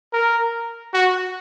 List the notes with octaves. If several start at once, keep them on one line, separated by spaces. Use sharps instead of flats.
A#4
F#4